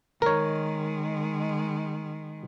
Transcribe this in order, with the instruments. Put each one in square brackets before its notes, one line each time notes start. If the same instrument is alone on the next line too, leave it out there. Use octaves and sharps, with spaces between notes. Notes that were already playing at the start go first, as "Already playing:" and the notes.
[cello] D#3 G#3 [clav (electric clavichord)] A#4 C#5